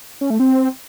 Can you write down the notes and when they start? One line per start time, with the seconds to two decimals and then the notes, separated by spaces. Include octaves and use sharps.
0.21 C#4
0.30 A3
0.40 C4